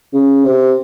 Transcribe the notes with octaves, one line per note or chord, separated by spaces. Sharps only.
C#3
C3